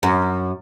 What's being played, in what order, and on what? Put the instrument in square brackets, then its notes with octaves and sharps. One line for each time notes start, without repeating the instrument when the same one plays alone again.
[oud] F#2